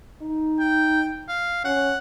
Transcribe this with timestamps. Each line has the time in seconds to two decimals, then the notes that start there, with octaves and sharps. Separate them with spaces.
0.21 D#4
0.60 G5
1.29 F5
1.65 C#4 F#5